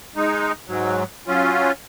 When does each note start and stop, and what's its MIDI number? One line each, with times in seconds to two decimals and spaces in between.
0.16 0.52 56
0.16 0.52 63
0.68 1.04 44
0.68 1.04 54
1.27 1.72 54
1.27 1.72 61
1.27 1.72 65